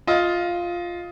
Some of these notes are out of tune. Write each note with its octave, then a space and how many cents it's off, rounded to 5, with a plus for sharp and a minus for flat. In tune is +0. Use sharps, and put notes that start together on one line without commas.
F4 +0 D#5 +15